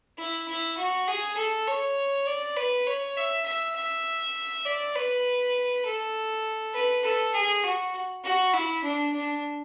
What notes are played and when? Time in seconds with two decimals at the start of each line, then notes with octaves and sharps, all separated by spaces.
0.18 E4
0.48 E4
0.77 F#4
1.08 G#4
1.37 A4
1.67 C#5
2.27 D5
2.57 B4
2.87 C#5
3.17 E5
3.46 E5
3.76 E5
4.66 D5
4.95 B4
5.86 A4
6.74 B4
7.04 A4
7.34 G#4
7.64 F#4
8.24 F#4
8.54 E4
8.83 D4
9.13 D4